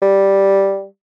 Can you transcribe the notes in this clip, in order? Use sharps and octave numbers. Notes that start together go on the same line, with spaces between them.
G3